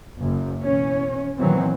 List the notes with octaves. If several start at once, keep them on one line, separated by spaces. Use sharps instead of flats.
F#1 F#2
B2 E3 C#4
A#2 D#3 E3 F#3 B3 C4